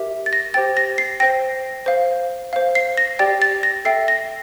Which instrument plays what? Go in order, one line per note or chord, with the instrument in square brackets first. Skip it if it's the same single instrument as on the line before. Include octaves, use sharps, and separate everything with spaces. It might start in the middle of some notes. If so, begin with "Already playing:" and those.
Already playing: [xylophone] G4 A#4 E5
A6
A#6
G4 C5 G5 A6
A#6
C7
C5 G5 A#6
C5 F5
C5 F5
C7
A#6
G4 D5 G5 A6
A6
A#6
A4 E5 G5 C7
A#6